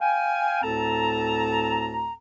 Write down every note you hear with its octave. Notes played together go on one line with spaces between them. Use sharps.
F5 G5 G#5
D2 A2 C4 A4 A5 A#5